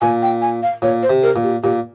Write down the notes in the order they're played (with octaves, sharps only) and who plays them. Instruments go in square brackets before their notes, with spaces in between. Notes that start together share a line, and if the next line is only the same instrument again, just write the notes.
[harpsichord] A#2 [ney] G#5
[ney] G5
G#5
F5
[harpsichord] A#2 [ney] C#5
[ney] C5
[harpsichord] C3
[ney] A#4
[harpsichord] A#2
[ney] G4
[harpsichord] A#2 [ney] G4